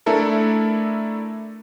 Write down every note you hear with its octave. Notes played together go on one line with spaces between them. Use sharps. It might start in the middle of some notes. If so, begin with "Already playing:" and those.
A3 D4 E4 A4 A#4